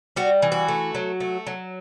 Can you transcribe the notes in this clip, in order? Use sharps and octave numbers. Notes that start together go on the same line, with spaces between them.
G3 F#4
E3
F#4
A3
F#3
A3
F#3